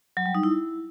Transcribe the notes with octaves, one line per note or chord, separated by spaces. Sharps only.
F#3
G3
D#4
E4